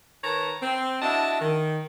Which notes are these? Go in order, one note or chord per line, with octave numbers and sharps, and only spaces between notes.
D#3 B4 C#5 A5 A#5
C4
D4 E4 F#4 D#5 E5 A5
D#3